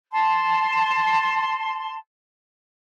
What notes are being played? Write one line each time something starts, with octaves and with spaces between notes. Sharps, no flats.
A5 C6